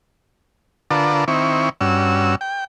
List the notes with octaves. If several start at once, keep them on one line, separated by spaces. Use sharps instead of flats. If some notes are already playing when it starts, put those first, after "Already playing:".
D3 F4 A#4 B4 D5 A5
D#3 C4 E4 C#6
G2 C#4 F#4 E6
G5